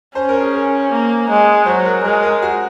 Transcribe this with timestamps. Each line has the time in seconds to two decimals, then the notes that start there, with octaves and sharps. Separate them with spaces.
0.15 C#4 C5
0.29 A#4
0.40 G#4
0.54 A#4
0.92 A#3
1.29 G#3
1.66 F#3 C5
1.85 A#4
2.04 G#3 A#4
2.23 A#4
2.42 F#4